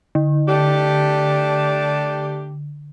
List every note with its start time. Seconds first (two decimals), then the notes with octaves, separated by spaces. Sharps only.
0.15 D3
0.48 A3 D4 G4